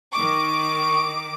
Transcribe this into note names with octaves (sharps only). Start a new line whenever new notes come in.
D#3 C#6 D6